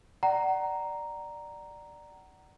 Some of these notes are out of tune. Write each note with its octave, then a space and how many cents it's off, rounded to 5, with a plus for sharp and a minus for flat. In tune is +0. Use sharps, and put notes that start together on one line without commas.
D5 +10 F#5 +35 A#5 +0